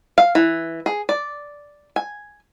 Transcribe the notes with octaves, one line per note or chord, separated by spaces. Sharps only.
F5
E3
G#4
D5
G#5